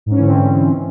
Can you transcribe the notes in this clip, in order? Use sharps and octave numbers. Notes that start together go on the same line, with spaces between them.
G#2 D3 E3 C4 C#4